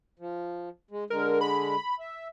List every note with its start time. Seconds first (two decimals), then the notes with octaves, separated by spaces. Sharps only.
0.19 F3
0.91 G#3
1.10 D3 G#3 A#4
1.41 B5
2.00 E5